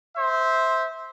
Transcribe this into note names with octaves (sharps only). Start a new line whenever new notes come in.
C5 E5